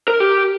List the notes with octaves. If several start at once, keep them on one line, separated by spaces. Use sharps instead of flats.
A#4
G4